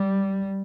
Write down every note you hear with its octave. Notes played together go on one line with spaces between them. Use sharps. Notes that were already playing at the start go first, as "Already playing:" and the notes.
Already playing: G3